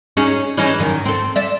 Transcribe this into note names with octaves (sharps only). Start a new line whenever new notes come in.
C#4 D#4 G#4
E3 C#4 D#4
F#2 D#3
C4 A4
D5 E5